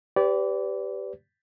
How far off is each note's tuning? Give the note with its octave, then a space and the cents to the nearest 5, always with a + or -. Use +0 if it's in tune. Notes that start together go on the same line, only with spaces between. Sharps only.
G4 -5 B4 +30 D5 -25